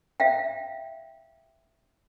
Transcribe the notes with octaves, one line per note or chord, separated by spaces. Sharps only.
E5 F5 G5